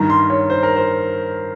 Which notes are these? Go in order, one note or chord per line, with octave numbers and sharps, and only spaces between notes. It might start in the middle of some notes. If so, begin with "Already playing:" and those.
Already playing: G2 D#3 A#5
C6
C#5
C5
A#4
C5